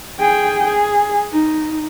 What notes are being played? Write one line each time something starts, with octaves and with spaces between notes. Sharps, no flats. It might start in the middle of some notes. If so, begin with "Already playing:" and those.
G#4 G5
G#4
D#4